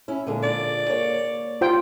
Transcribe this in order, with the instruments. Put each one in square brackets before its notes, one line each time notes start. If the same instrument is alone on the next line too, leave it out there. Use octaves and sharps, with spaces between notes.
[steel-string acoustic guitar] C#4 E4
A#2 D3 G#3
[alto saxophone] D5
[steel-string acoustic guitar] A#3 C#5
[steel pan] F4 C5 G5 [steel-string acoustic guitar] G4